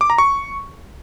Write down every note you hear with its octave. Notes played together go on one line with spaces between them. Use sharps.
D6
A#5
C#6